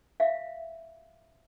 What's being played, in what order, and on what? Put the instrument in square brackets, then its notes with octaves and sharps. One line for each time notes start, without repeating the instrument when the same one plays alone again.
[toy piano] E5 F5